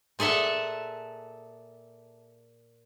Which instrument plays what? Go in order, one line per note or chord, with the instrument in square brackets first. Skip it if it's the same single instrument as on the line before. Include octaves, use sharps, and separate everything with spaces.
[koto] A#2 G#4 A4 E5 F#5